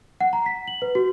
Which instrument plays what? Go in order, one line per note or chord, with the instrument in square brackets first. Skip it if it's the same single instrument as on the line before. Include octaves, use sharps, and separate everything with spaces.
[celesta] F#5
A#5
B6
F#7
B4
F#4